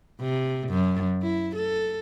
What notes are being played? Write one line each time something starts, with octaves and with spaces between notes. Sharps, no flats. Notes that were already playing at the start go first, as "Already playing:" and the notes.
C3
F#2
E4
A4